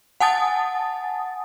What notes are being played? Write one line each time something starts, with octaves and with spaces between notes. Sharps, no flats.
F#5 G#5 A5 D#6 A6